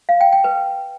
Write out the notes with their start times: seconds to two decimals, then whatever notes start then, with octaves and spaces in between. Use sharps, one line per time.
0.09 F5
0.21 G5
0.32 G5
0.44 B4